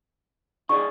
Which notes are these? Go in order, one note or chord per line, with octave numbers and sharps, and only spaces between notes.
D#4 G#4 D5 C#6